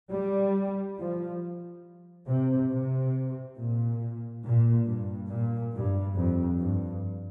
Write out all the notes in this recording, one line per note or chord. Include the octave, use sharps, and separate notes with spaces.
G3
F3
C3
C3
A#2
A#2
G2
A#2
G2
F2
G2